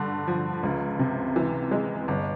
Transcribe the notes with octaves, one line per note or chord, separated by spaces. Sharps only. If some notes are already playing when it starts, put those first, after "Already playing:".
Already playing: G2 D3
F3
C#2
C3
E3
G#3
G1